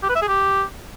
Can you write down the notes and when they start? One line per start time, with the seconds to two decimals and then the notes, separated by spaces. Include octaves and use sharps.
0.03 G4
0.09 B4
0.16 E5
0.22 G#4
0.28 G4